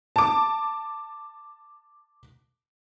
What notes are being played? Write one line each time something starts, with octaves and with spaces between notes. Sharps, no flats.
A5 D6